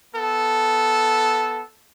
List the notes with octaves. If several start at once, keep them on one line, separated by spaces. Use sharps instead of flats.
B3 A4